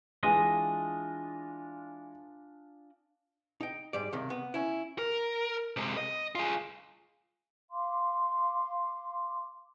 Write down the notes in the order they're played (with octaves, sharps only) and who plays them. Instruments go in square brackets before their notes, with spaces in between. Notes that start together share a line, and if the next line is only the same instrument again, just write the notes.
[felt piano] E3 G#3 [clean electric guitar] D4 F4 D#5 [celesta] G#5 D#7
[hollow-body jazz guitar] D#4 G5
G#2 G3 D5
C#2 C3 D#3
B3
C#4 E4
[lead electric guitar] A#4
C3 G#3
D#5
F4 G#4
[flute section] F5 C6 D6